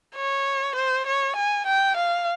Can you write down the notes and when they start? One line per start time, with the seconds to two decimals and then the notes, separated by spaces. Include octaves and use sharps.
0.15 C#5
0.75 C5
1.06 C#5
1.36 G#5
1.66 G5
1.96 F5